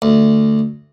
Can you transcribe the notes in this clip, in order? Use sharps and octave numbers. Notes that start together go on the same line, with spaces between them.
D2